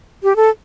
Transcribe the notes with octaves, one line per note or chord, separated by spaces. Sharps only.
G4
A4